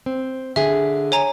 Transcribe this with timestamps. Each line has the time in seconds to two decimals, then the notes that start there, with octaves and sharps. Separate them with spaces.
0.06 C4
0.56 D3 G#4 E5
1.12 C#5 G#5 A#5